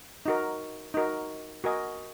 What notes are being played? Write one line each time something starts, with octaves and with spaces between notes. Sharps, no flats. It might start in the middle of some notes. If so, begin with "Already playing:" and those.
D#4 F#4 A#4
D#4 F#4 A#4
F#4 A#4 D#5 G#5